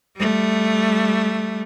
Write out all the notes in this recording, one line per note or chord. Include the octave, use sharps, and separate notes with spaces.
G3 A3